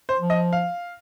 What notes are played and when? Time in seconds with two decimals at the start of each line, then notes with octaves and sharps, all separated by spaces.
0.09 C5
0.19 F3
0.30 D#5
0.53 F5